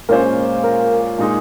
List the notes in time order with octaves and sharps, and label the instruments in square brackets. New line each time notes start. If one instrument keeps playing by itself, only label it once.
[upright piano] A#2 G#3 C#4 F4 C5 [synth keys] A#4
[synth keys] A#4
[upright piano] A#2 G#3 D#4 G#4